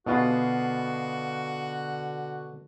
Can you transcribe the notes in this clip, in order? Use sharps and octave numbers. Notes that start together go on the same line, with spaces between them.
B2 D3 B3 F4 F#4 G#4